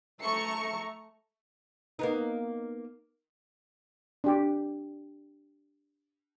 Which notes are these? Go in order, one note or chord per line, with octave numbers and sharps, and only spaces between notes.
A3 E5 A#5 C#6 C#7
A#3 B3 D#4
D4 G4